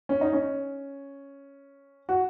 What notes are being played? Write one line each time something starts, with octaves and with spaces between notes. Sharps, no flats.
C#4
D#4
C#4
F#4